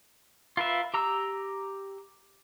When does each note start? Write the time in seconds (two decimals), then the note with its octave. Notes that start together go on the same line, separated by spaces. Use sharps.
0.57 F4 A#4 B4 E5
0.94 G4 A#5 E6